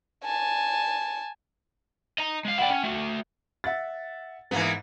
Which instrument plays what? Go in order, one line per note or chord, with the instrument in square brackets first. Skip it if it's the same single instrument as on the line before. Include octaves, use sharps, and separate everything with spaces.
[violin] G#5 A5
[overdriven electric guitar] D#5 A#5
G#3 F5
[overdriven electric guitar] E4 D5 [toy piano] F#5 G5
[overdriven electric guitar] C#4 [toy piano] G5
[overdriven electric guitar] A3 F#4
[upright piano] E5 F#5 A6
[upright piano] G#2 [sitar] E3 A#3 B3